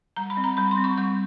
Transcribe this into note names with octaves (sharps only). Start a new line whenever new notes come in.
G3 A#5
B5
C4
A#5
G3 B5
C6
C4
C#6
G3 C#6